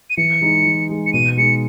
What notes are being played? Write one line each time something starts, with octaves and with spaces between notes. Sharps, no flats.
D#7
E3 C#7
G#3 D#4
E3
G#3 D#4
C#7
B2 D#7
G#3 D#4 C#7